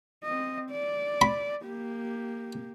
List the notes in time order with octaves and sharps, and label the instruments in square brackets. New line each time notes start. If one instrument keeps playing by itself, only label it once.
[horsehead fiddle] C4 D#5
D5
[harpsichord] B5
[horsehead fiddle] A#3 G4